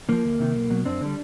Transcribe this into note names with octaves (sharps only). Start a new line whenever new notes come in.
D3 F3 A#3
D2
C3 D#3
B1
B2 F#3
F#2 C4 D4
D3 G3